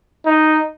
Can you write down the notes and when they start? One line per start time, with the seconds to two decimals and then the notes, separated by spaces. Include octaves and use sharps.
0.26 D#4